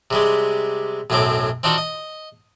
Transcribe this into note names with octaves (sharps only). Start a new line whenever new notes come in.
C3 G3 G#3
B1 F#2 A2 F#3 C4 D6
C4 D4 D#4 F4 F#4 F#5
D#5